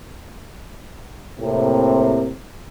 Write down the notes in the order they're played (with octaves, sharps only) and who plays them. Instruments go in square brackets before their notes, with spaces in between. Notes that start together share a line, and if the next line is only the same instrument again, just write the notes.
[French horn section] A2 C3 A#3 C4